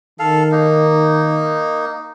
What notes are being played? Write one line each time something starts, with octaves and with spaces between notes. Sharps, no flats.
D#3 A4 F5
A#3 D#4